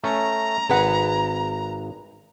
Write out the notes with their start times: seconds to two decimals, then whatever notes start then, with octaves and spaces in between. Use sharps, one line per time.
0.04 A3 C#4 A#5
0.69 G#1 G#4 B4 F#5